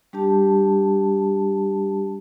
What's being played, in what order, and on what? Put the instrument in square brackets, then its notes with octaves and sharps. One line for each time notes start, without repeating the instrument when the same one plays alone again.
[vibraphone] G3 D4 G4 A5